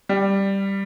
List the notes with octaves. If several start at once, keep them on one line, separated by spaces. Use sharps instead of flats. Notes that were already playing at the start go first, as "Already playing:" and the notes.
G3